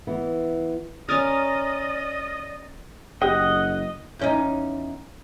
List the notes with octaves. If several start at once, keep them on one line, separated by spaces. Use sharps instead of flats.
E3 B3
C#4 A#4 D5 D#5 D#6 F6 A6
F#1 G4 D#5 F#5 G5
E2 C#4 D#4